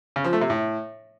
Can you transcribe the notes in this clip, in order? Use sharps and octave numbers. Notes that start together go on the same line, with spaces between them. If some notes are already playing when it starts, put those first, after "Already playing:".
C#3
F3
A3
C3
A2